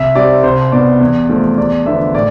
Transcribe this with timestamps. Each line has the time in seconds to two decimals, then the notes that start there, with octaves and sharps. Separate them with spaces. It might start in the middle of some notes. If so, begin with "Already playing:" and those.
Already playing: C2 E5
0.15 C3 G3 C4 D5
0.44 C2 C5
0.72 B2 B3 D5
1.00 E2
1.29 C3 F3 A3
1.57 E2 D5
1.86 D3 F3 B3 E5
2.14 A2 D5